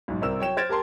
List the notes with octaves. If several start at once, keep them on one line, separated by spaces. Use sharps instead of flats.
B1 G#2
C2 C4 A#4 E6 E7
F#3 C#5 G5 E7
C5 F6 G#6 A6 D7 E7
G4 A#4 A5 C6